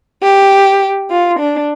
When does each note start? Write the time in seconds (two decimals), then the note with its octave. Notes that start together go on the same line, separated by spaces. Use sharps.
0.23 G4
1.11 F4
1.39 D4